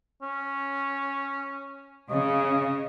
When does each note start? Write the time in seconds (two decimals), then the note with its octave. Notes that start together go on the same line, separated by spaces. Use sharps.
0.22 C#4
2.10 C#3 D#5